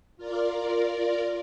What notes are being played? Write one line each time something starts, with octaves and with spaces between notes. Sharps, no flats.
F4 A#4 D5